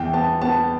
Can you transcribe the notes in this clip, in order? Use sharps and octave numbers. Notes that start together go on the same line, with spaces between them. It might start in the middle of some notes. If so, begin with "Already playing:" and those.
Already playing: E2 G5
B3 A5
B3 A5